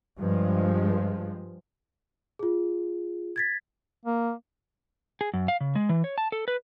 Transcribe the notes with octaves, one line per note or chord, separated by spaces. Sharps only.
G2 F3 G#3
F4 G#4
G#6 A6 B6
A#3
G#4
F#2
F5
C#3
G#3
E3
C#5
A5
A4
B4